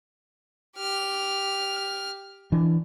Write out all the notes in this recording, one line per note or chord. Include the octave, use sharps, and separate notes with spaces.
G4 F6
E3 D4